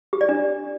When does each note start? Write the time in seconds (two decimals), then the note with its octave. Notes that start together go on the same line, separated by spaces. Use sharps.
0.13 G4
0.21 D5
0.29 D4